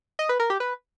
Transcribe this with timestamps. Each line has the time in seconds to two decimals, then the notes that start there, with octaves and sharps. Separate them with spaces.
0.19 D#5
0.29 B4
0.40 A#4
0.50 G4
0.60 B4